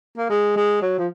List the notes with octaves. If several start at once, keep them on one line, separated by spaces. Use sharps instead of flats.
A#3
G#3
G#3
F#3
F3